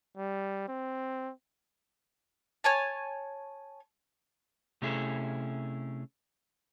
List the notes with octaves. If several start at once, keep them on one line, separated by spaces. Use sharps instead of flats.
G3
C4
C#5 G#5 A5
C3 A3 C#4 E4 G#4 A4